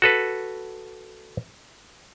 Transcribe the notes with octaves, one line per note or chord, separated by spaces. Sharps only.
F#4 A4 B4